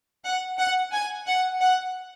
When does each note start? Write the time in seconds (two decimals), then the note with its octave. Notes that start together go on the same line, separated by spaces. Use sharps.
0.25 F#5
0.59 F#5
0.93 G#5
1.27 F#5
1.61 F#5